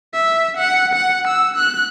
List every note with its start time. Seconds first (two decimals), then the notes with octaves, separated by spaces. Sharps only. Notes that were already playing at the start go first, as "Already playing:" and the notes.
0.14 E5
0.57 F#5
0.94 F#5
1.27 E6
1.56 F#6